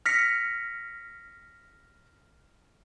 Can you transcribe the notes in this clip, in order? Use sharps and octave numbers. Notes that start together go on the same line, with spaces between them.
F6 A#6 B6 C#7